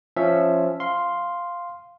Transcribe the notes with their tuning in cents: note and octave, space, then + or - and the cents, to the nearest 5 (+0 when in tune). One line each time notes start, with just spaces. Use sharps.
F3 +0 C#4 +0 E5 +0
F5 +0 C6 +0